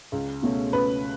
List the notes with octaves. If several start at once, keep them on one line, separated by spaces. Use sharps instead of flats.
C#2
B2 A3 C#4
C#2 B4